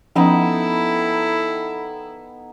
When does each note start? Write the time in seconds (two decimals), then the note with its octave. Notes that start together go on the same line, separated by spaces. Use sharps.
0.16 F3 B3 C#4 D#4 E4 A4 G5